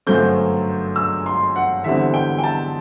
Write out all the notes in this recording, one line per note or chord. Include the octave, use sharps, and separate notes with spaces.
G1 F#2 F#3 A3 C4 G6
E6
C6
F#5
E2 D3 G3 C4 E5
G5
G5
A5